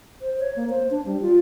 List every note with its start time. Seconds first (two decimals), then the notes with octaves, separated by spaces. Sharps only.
0.21 C5
0.40 C#5
0.56 A#3
0.69 C5
0.91 D4
1.05 G3
1.22 F4